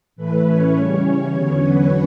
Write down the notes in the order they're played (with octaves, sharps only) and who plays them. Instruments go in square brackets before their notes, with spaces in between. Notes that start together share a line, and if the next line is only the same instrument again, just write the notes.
[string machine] A2 E3 A3 B4
C#4 C#5
C#3 E3 G3
E2 D3 F#3 B3
B4